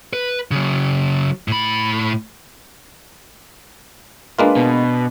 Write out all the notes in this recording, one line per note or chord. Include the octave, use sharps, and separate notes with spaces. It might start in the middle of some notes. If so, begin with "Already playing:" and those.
B4
C#3 F#3
A2 B5
G#3 A#3 D4 F4 B4
B2